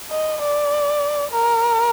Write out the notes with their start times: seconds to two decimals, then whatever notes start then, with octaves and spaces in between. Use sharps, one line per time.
0.11 D#5
0.42 D5
1.32 A#4